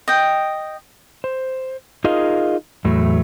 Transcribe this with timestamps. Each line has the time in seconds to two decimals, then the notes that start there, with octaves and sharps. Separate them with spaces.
0.08 D#5 G5
1.24 C5
2.04 D#4 F4 G#4 A#4 D#5 F5
2.85 E2 A2 F#3 A3